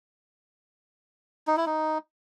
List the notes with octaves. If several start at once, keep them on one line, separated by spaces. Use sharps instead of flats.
D#4
E4
D#4